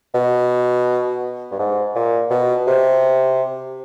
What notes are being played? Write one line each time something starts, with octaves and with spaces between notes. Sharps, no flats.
B2
G2
G#2
A#2
B2
C3